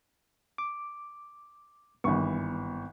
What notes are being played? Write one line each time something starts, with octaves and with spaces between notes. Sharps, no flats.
D6
G#1 G2 E3 B3 C#6